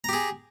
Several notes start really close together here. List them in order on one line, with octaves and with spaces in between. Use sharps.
A#5 G4 G#4